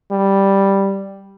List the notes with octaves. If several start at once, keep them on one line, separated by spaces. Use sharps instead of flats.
G3